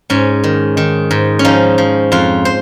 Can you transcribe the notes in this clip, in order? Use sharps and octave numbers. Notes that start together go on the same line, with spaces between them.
G#2 C#4
D#3
D#3
G#2
C#4
F3 D#4
F3
F2 F4
C5